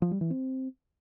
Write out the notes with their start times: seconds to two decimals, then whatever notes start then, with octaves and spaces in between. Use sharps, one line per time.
0.02 F3
0.11 G3
0.21 E3
0.30 C4